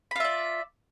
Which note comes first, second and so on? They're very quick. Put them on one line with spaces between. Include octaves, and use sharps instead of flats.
B5 F4 E5 D5